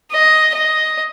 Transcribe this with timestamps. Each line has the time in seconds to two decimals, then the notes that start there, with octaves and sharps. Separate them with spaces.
0.12 D#5
0.54 D#5